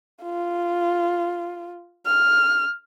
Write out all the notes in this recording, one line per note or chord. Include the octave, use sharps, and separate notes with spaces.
F4
F6